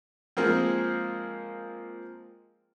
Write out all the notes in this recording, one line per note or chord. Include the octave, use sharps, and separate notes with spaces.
F3 G#3 A#3 C4